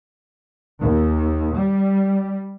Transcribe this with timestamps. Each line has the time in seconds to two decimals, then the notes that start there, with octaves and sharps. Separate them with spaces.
0.80 D#2
1.54 G3